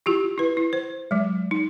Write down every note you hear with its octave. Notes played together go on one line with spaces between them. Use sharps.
E4 F4 G4
E4 B4
E4
C5
F#3 G#3
D#4